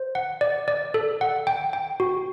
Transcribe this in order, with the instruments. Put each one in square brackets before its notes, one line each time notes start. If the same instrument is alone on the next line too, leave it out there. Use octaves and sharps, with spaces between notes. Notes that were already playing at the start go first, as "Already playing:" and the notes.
Already playing: [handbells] C5
F#5
D5
D5
A4
F#5
G5
G5
F#4